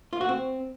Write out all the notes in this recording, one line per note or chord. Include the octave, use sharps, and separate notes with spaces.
F4
F#4
C4